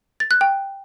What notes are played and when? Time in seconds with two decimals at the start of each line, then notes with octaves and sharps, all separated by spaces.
0.20 A6
0.31 F#6
0.41 G5